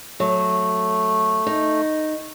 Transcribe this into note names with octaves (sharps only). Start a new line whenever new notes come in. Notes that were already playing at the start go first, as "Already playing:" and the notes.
F#3 A3
D#4